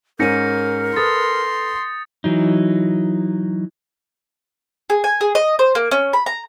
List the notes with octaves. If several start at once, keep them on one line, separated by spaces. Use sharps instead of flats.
G#2 C#4 A#4 G6 A#6 C#7 D#7
A4 B4 C6 D#6 A6
E3 F#3 D#4
G#4
G#5
G#4
D#5
C5
A#3
C#4
B5
A#5